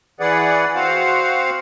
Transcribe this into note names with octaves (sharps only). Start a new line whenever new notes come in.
E3 G#4 B4 D5 F#5
C4 F#4 C5 F5 F#5